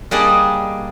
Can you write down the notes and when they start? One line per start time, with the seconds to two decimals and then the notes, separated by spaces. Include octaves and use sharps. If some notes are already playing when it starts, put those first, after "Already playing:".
0.11 G3 A#3 D4 G#4 D5 D#5